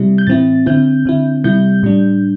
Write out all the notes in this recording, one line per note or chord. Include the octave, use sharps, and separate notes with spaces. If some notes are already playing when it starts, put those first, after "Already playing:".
Already playing: C3 G3 E4
G6
A2 E3 C4 E4 A6
D3 C4 E4 G6
D3 C4 E4
C3 G3 E4 G6
A2 G3 D4